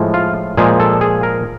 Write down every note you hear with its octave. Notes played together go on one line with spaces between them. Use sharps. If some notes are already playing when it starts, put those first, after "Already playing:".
Already playing: A2 F3 G#3
F4
A#2 F3 G#3 G#4
A4
G#4
A#4